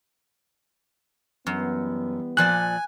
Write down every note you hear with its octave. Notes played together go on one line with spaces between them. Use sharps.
F#2 E3 G3 B3
A#2 F3 D5 G#5 F#6